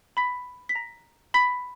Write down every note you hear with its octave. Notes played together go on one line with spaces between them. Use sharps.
B5 B6
B6
A#5 A#6
B5 B6